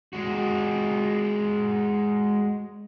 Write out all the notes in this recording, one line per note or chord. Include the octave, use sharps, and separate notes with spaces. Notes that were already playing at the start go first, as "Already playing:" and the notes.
G#3 F#4